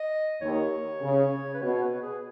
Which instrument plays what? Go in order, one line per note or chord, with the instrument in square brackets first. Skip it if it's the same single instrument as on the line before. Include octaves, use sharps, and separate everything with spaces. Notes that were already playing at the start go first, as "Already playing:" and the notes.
Already playing: [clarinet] D#5
[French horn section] D#2 D#3 [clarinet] C#5
[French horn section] C#3
[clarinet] B4
[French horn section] B2 [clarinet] C#5
[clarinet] C#5
B4
G#4